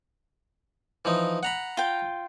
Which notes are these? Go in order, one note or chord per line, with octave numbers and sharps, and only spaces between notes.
E3 F3 D#4
F#5 A#5 B5
F4 G5